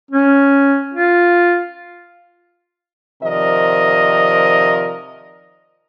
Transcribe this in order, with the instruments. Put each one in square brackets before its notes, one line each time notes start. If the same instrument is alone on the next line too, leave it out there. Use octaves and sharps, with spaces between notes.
[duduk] C#4
F4
[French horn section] C3 D#3 F3 A#4 D5 D#5